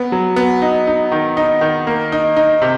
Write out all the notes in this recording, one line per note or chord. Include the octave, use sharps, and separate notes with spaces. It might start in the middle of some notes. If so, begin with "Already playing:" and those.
Already playing: B3
F#3
B3
D#4
D#4
D#3
D#4
D#3
A#3
D#4
D#4
C3